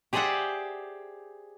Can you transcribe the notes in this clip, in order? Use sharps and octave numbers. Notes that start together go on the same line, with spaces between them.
G4 G#4 C5 D5 E5 F#5